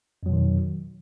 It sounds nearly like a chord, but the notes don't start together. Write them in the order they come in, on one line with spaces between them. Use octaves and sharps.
F2 F#3 B2 D#3